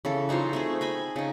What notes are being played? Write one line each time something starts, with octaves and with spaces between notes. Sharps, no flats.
C#3 E3 A4
F#3 D#4 F4 C5
A3 C4 G#4
D#5 G#5 B5
C#3 D#4